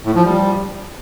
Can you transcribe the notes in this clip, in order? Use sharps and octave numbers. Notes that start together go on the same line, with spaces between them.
A2
F3
G3